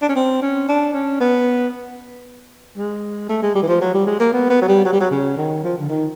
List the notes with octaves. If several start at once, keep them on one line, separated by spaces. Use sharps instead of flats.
D4
C#4
C4
C#4
D4
C#4
B3
G#3
A3
G#3
G3
E3
F3
F#3
G3
G#3
A#3
B3
B3
F#3
G3
F#3
G3
F#3
C#3
D#3
F3
D3
D#3